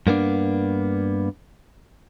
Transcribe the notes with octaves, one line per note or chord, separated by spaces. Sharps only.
G2 A#3 B3 D4